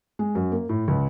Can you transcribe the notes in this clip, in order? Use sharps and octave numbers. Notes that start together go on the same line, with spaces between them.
G#3
F#2
A#3
A2
C#2